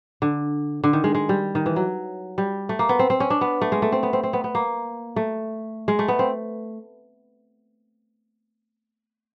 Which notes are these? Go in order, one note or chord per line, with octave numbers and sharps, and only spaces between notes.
D3
D3
D#3
G#3
G#3
G3
D#3
E3
F#3
G3
A3
A#3
B3
C4
C4
C#4
D4
B3
A3
G#3
A3
C4
B3
C4
C4
B3
B3
A#3
A3
G#3
A3
B3
C4